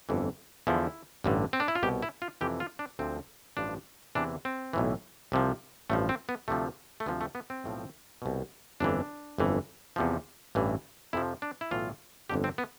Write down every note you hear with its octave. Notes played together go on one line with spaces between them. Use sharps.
G1 F2 E3
E2 D3 F3 E4
A1 G2 D3
C4
D4
E4
F4
C2 B2 G4
E4
F4
F2 C3 E3 G4
F4
D4
D2 D3 F3 C4
A1 G2 F3 D4
E2 C3 E3 D4
C4
B1 A2 E3
C2 C3 F3
A1 G2 F3 A3
C4
B3
D2 C3 F3 A3
A3
D2 C3 F3 B3
A3
B3
C4
B1 A2 F3
C2 B2
G1 F2 E3 D4
G1 F2 E3
E2 C3 F3
A1 G2 E3
F2 C3 F3 E4
D4
E4
B1 A2 E3 F4
G1 F2 D3 G4
C4
B3